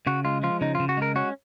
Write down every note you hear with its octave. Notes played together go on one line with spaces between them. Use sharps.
C#3 F#4
G#3 F4
F3 F4
C#3 D#4
F4
C#3
F#4
G#3 A#4
C#4 F#4